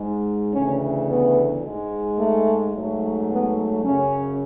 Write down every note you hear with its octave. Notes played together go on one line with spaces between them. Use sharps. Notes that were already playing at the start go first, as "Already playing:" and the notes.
Already playing: G#2 G#3
D2 C#3 E3 A3 C#4
B3
G#2 G#3
A3
G#2 F#3 A3
B3
F#2 C#3 F#3 C#4